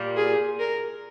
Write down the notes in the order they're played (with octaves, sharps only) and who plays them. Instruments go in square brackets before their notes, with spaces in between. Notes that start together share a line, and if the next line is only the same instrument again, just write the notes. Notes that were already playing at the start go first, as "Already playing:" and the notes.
Already playing: [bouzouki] A#2 G3 A#3
[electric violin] G#4
A#4